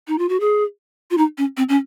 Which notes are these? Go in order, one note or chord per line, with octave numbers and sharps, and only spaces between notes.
D#4
F4
F#4
G#4
F4
D#4
C#4
C4
C#4